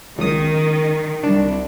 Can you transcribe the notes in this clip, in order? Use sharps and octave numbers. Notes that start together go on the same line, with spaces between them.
C#2 D#3 D#6
C2 D4